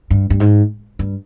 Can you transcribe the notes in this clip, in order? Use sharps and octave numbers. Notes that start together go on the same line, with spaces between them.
G2
G2
G#2
G2